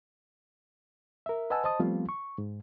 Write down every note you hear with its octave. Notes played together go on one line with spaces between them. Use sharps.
A#4 E5
B4 D#5 F#5 G#5 A5 E6
C5 D#5 A5 D#6
F3 G3 A3 B3 C4 F4
C#6
G#2